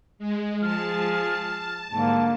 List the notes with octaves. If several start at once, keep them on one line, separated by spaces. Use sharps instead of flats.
G#3
F3 G#4 A5 F6
G#2 D3 G3 A#3 A5